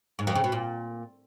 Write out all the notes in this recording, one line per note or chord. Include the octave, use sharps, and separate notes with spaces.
G#2
F2
C#3
B2
A#2